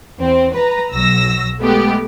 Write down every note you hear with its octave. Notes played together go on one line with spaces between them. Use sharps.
E2 C4
B4 A#5
B1 F#3 E6 A#6
G#3 A3 B3 G4